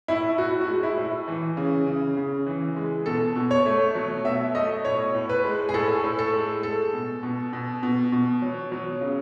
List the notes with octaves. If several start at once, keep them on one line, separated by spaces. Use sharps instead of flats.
A2 E4
A2 F#4
F#4
G#3
E4
A2
E3
C#3
C#3
C#3
E3
G#3
B2 A4
B2
C#5
A3
F#3
B2 E5
A3 D#5
A2 C#5
A2
B4
G#3
G#4
A2 A4
A2
A4
G#3
G#3 A4
B2
B2
B2
B2
B2
F#3
F#3
C#3